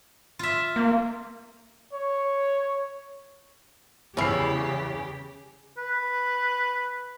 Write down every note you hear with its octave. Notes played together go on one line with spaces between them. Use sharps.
F4 E5
A#3
C#5
E2 C#3 C#4 E4 G4 C7
B4